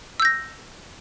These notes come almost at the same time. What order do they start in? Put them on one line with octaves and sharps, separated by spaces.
E6 G6 A#6